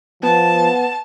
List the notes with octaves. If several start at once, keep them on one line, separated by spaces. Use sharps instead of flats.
F3 B3 A5